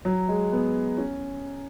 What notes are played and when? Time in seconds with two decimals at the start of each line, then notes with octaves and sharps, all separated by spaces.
0.05 F#3
0.28 G#3
0.52 B3
0.98 C#4